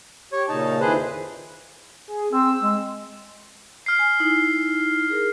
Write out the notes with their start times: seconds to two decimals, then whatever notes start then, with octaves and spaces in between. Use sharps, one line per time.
0.32 G4 C#5
0.49 A#2 C#3 D#4 A5
0.81 F2 D#3 E3 G#4 B4 C5
2.08 G#4
2.33 C4 E6
2.63 G#3
3.86 F6 C7
3.99 G#5
4.20 D#4 E4
5.10 G#4 A#4